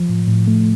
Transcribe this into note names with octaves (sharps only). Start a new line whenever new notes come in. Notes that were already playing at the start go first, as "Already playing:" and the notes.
Already playing: F3
A2
A2
A3